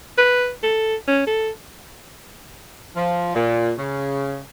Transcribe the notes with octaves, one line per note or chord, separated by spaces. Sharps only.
B4
A4
C#4
A4
F3
A#2
C#3